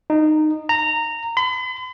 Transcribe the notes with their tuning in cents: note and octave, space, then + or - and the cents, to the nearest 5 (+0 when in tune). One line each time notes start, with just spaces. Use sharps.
D#4 -15
A#5 -15
B5 +45